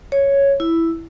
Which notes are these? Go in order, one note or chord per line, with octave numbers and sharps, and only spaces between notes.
C#5
E4